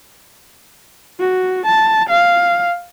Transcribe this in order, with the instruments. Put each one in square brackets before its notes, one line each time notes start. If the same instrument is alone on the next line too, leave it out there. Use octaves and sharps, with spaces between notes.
[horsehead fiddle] F#4
A5
F5